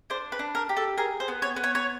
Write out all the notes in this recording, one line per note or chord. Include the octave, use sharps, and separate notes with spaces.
D4 C5
B4
D4
A#4
G4
A4
G#4 A#4
C5
B3
C#5
B3
C#5
C#5